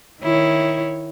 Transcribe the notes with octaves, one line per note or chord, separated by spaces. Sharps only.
D#3 E4 C#5